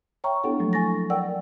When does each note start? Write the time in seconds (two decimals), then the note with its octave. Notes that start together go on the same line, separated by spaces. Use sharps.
0.24 C#5 E5 G5 A#5 C#6
0.44 B3 D4 E4 G4 A4 F#5
0.59 F3 F#3 A3 A#3
0.73 G#5 C#6 A6 A#6
1.10 A#4 D5 F#5 G5 E6